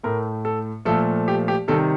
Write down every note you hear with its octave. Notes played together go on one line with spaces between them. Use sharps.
A2 A3 A#4
A4
A#2 F3 A3 A4
G4
G4
C3 D#3 G3 A4